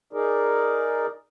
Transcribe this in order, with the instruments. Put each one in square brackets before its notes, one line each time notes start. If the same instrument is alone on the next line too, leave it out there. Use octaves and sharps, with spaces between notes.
[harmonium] D#4 G#4 A#4 D5